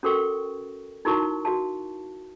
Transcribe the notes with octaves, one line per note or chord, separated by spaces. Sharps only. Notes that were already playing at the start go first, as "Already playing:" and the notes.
C#4 F#4 A4 A#4 G5 C#6
D#4 E4 F#4 A#4 A5 C#6
F#4 F5 A5